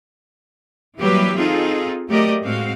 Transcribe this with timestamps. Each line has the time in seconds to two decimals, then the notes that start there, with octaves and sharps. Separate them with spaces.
0.99 E3 F#3 G3 A#3 G4 B4
1.39 C4 D#4 F4 G#4 A4
2.08 F#3 A3 G4 A#4 D5 D#5
2.42 A2 G#3 C4 F#4 F5